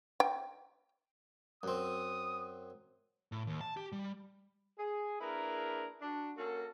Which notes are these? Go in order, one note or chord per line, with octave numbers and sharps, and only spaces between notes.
G5
F#2 C4 D#6
A2
D#2
A5
G4
G3
G#4
A#3 D4 E4 G#4 A#4 B4
D4 F#4
A#3 C#4 F#4 A4